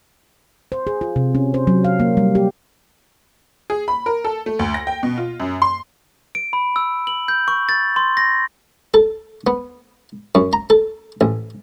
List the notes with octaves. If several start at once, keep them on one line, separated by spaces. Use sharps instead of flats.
C5
G#4
F4
C3
C#4
C5
F#3
F5
A#3
G3
G4
G#4
B5
A#4
A4
A3
D2
A#6
G5
B2
F4
F#2
C6
D7
B5
E6
F#7
G6
C#6
A6
C6
A#6
A4
B3
F#2
A#5
A4
A1